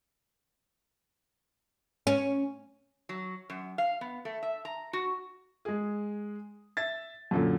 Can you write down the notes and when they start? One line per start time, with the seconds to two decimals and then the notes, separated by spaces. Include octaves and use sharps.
2.07 C#4
3.09 F#3
3.50 F#2
3.78 F5
4.01 B3
4.25 A3
4.43 E5
4.65 A#5
4.93 F#4
5.65 G#3 G#4
6.77 E5 A6
7.31 F#2 A#2 D3